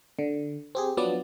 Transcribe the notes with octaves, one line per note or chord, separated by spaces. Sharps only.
D3
C4 G4 G#4
F3 F#3 B3 D4 D5